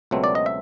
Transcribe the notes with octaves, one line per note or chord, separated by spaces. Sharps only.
C#2 B2 F#3 A3 C4
D5
D#5
E5